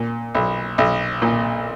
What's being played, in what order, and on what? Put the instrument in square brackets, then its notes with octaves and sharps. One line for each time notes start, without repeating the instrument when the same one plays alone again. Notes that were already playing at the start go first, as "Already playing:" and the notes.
Already playing: [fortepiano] A#2
B1
B1
A#2